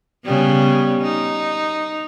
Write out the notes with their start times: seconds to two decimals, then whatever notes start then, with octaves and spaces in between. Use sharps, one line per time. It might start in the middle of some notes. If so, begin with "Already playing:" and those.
0.25 C#3 G3 B3
1.02 D#4